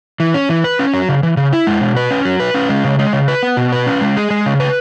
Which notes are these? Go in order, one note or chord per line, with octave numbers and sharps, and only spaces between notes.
E3
C#4
E3
B4
C#4
F#3
C#3
E3
C#3
E4
G#3
B2
B4
C#4
F#3
B4
C#4
G#3
C#3
G#3
C#3
B4
B3
B2
B4
C#4
G#3
G#4
G#3
C#3
B4